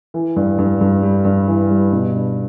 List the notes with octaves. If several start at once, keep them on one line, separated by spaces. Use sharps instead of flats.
E3
G2
G2
G2
G3
G2
E3
G3
B2
D4